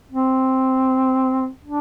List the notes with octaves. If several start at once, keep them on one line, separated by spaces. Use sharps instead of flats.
C4
D4